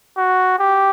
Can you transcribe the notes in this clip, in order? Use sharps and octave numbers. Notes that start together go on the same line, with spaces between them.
F#4
G4